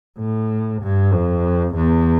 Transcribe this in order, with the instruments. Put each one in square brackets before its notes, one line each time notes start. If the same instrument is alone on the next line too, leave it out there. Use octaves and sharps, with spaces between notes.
[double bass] A2
G2
F2
E2